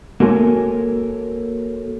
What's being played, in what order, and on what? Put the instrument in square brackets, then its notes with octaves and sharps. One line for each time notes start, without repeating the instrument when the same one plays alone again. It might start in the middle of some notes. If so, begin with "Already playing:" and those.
[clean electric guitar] A#3 F#4 A4 A#4 C#5 G#5